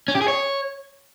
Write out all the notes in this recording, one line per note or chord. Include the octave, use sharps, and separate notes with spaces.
C#4
G4
G#4
C#5